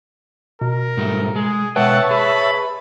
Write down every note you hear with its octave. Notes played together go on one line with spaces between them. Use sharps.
B2 A#4
G#2 G3 A3
G#3 G#4
B2 G#3 B4 C#5 E5 F#5 G5 A5
G#4 B5